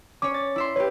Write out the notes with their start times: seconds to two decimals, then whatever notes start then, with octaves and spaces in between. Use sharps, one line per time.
0.22 C#4 C#5 D6
0.34 A6
0.56 E4 E5 C6
0.76 G4 B4 C#5